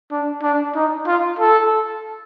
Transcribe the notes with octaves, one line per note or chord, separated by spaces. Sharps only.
D4
D4
D#4
F4
A4